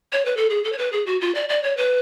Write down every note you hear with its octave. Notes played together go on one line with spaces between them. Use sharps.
C#5
B4
A4
G#4
A4
C#5
B4
G#4
F#4
F4
D5
D5
C#5
B4